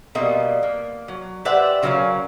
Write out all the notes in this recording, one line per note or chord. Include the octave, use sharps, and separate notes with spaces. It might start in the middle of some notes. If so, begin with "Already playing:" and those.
B2 G3 A#3 C4 D#5
A#3
F#3
G4 B4 C5 D5 E5 F#5
C#3 F#3 C#4 A#4 C#5 F5